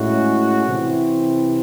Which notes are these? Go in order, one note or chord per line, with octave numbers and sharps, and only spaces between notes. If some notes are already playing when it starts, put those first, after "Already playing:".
Already playing: A2 G#3 C#4 E4 F#4
C3 E3 C4 E4